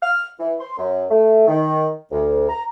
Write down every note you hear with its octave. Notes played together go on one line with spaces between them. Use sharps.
F6
E3
C6
F#2
A3
D#3
D2
A#5